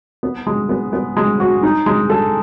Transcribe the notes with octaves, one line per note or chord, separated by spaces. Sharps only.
B3
G#3
B3
B3
G#3
F#4
D#4
G#3
A4